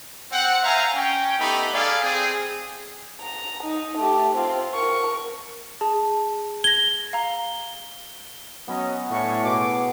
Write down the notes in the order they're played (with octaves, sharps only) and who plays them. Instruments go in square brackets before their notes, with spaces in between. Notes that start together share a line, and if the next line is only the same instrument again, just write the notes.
[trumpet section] C4 F#5
C5 E5 F5 G#5 A#5
C#4 G5
A3 B3 D#4 G4 B5
G#4 A4 D5 F5
C4 G#4
[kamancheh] A#5
D#4
A3 G4
C4 F4
A#4 C#6
[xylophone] G#4 A5
[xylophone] G#6 A#6 [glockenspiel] G7
[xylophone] F5 A#5
[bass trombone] F#3 [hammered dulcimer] B3 [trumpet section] C#4 D#5
[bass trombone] A2 [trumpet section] D4 G#5 C#6
[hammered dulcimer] B2 G#4 [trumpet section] D6